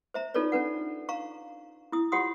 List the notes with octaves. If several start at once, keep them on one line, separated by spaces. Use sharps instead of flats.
C5 E5 A#5
D#4 F4 A4 B4 C#5 D5
C#4 D4 B4 F#5
F5 A#5 C#6
E4 D#6
F4 G4 C#5 F#5 C6 D#6